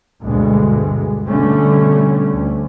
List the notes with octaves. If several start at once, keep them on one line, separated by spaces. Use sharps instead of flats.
D2 G2 B2 G#3
B2 D3 G3 A3 C#4
D2